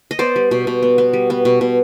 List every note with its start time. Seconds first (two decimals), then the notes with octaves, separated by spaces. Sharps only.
0.11 D#5
0.19 B3 C5 D5
0.36 G3
0.51 B2
0.67 B2
0.83 B3
0.98 B3
1.13 G3
1.30 B3
1.45 B2
1.61 B2